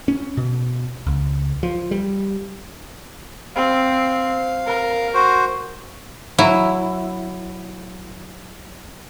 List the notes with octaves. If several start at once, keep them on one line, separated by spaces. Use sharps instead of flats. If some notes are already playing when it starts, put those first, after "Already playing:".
C#4
B2
C#2
F3
G3
C4 F5
A#4
F#4 C5
F#3 E4